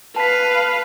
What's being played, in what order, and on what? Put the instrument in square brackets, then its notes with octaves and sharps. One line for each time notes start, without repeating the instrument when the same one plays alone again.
[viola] B4 F5 [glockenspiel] A5 B6